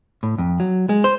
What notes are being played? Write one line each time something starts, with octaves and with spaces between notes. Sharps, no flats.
A2
F2
F#3
G#3
C5